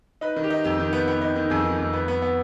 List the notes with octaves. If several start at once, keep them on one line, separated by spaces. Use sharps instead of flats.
D#4 B4
D#3
G4
D#4
F2 G4
D#3
B3
B3
D#4
D#3
F2 G#4
D#3
F2
B3
B3
B3